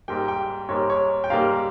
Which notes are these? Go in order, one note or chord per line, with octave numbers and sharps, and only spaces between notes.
G#2 G3 A#3 G5
G5
G#2 G3 A#3 C#5
C#5
G5
G#2 G3 A#3 F5